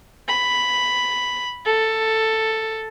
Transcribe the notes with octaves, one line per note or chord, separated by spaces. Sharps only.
B5
A4